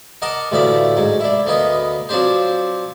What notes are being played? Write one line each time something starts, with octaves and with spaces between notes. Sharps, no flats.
A#4 D#5 F#5 A5 D6
A1 D2 A2 F3 D5 E5
G#2 F#3
D4 E4
D2 A#3 B3 D#5
F3 F#3 C4 D4 G4 C5